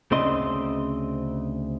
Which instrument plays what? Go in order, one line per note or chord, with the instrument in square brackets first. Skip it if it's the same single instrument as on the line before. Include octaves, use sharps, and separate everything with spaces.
[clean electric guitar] D2 C#3 C4 D5 D#5 C6